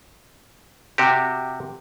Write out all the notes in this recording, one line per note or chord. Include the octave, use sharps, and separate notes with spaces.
C3 F#4 G4